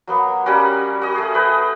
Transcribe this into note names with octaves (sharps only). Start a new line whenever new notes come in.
F#3 A#3 B3
G3 A#3 C#4 F#4
F#4 D#5
A3 G#4
B4 D#5 G5